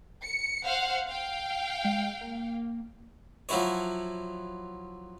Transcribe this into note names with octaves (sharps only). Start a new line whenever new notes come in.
C#7
C5 F5 F#5
F5 G5
G#3
A#3
F3 F#3 E4 C#5